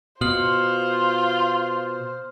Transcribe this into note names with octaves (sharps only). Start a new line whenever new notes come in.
B2 F4 C5 D#6 F6 F#7